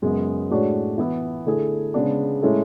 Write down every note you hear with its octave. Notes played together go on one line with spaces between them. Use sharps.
F#2 C#3 G#3 B3
A2 G#3 D4 F#4 C#5
E3 B3 E4
D3 A3 E4 G#4
C#3 G#3 B3 D4
A2 G#3 C#4 E4 A4